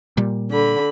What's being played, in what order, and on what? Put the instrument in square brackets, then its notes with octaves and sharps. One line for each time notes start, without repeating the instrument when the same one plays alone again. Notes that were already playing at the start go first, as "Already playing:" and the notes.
[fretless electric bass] A#2 G3
[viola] D3 B5